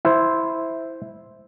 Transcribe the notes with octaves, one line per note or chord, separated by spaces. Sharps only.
E4 C5